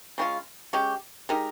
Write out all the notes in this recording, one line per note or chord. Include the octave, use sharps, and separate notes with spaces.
C#3 G#3 C#4 F4
G#3 C#4 G4
G#3 D#4 G4 A#4